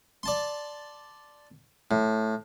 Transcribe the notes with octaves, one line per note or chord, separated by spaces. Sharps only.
D5 A5 C6
A2